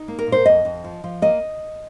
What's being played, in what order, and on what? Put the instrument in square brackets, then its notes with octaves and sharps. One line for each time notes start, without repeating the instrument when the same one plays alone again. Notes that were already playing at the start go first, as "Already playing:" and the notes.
Already playing: [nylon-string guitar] D#4
A#3
A#4
A#2
C5
F2 D#5
F2
F3
F3
A#3 D#5